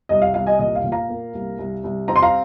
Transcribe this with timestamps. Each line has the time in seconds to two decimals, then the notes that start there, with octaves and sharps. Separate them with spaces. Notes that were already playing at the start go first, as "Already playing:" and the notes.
0.09 C2 D#5
0.22 F5
0.34 C2 F5
0.47 D#5 G#5
0.59 A#2 D#5
0.76 F5
0.84 A#2
0.92 F5 A#5
1.09 A#3
1.34 C2
1.58 C2
1.84 C2
2.08 C4 A#5
2.16 C6
2.22 F5 A#5